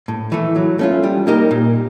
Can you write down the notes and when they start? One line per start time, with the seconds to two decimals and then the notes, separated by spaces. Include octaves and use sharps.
0.08 A2
0.32 E3 A3
0.56 F#3
0.79 A3 C#4 F4
1.03 G3
1.27 A#3 D#4 G4 A#4
1.51 A#2